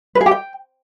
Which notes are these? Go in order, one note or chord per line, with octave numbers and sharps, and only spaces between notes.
B4
G#4
G4
G5